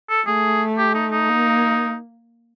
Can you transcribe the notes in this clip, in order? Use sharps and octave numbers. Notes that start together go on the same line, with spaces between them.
A4
A3 G#4
G4
D#4
D#4
A#3